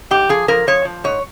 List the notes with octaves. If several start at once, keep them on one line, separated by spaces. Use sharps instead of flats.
G#2 G4
F3 G#4
F3 A#4
F3 C#5
F3
G#2 C#5